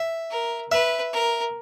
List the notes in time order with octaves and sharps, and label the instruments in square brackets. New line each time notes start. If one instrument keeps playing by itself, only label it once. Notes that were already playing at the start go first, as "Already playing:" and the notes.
Already playing: [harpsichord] E5
[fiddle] A#4
[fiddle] B4 [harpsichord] E5
[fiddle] A#4